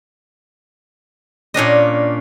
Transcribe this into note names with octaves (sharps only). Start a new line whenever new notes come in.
A#2 C#4 D4 D#5